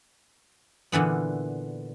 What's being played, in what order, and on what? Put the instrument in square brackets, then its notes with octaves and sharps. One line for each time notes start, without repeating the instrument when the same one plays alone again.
[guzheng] A#2 D3 E3 B3